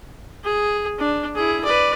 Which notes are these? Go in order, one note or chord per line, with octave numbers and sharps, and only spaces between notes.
G#4
D4
E4 G#4
B4 D5